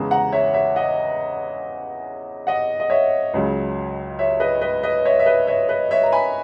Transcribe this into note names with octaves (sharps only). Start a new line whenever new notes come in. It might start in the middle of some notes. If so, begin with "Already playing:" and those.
Already playing: E2 C#3 G#3
F#5 A#5
C#5 E5
C#5 E5
D#5 F#5
D#5 F#5
D#5
C#5 E5
C#2 C#3 F#3
C#5 E5
B4 D#5
B4 D#5
B4 D#5
C#5 E5
E5
B4 D#5
C#5 E5
B4 D#5
C#5 E5
A#5
G#5 B5